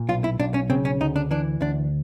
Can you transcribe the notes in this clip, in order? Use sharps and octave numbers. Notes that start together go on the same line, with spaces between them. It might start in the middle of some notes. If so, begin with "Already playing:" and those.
Already playing: A#2
B1 F4
E4
B1 D4
C#4
C#3 C4
C#4
D2 D#4
D4
E3 D4
D2 D4